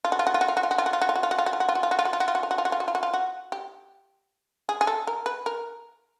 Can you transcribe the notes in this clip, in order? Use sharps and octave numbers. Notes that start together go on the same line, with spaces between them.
F4
F#4
F4
F#4
F4
F#4
F4
F#4
F4
F#4
F4
F#4
F4
F#4
F4
F#4
F4
F#4
F4
F#4
F4
F#4
F4
F#4
F4
F#4
F4
F#4
F4
F#4
F4
F#4
F4
F#4
F4
F#4
F4
F#4
F4
F#4
F4
F#4
G4
G#4
G#4
A4
A#4
B4
A#4